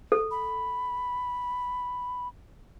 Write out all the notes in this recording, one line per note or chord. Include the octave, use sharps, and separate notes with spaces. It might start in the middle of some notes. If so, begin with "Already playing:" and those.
A4
B5